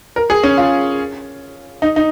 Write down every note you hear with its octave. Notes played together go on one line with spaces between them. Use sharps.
A#4
G#4
C#4
F4
D#4
D#4